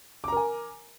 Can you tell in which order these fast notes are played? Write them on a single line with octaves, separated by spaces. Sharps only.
D6 A#5 A#4 G#5